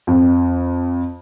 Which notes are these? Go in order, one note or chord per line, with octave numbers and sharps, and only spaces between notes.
F2